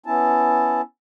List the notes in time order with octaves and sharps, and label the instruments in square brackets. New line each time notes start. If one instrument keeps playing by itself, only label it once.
[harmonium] B3 C#4 E4 A5